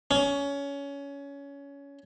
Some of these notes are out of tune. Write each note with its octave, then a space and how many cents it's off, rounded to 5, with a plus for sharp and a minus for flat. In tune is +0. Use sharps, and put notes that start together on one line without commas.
C#4 +20